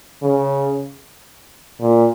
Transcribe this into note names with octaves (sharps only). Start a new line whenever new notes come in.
C#3
A#2